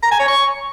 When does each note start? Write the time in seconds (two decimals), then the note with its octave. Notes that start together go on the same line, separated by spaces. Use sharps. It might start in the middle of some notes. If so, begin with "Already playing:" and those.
0.03 A#5
0.11 G#5
0.20 C#5
0.28 C#6